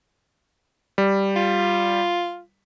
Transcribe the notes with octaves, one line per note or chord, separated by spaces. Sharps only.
G3
F4